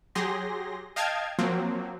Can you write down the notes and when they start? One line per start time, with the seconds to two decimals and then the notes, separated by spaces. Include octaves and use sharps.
0.15 F#3 G4 G#4 C6 A#6
0.96 D#5 F5 G5 A5 F6 G#6
1.38 F3 F#3 A#3 C4